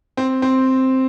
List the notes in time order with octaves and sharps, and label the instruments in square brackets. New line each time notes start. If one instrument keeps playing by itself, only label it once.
[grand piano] C4
C4